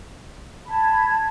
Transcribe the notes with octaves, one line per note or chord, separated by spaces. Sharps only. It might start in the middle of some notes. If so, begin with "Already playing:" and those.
A5 B5 G#6